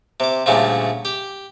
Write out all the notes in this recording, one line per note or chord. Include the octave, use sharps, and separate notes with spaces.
C3 D6
D2 A#2 C#3 G3 A3
G4